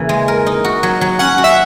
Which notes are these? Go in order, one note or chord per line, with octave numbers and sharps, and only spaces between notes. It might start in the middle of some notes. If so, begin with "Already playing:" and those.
Already playing: E2 C#3 E3 A#3
G#3
A#4
D#4
F#4
F#3
F#3
C#4 F#5
F#4
E5